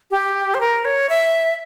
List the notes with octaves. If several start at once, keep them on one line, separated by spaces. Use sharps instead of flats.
G4
C5
A#4
C#5
E5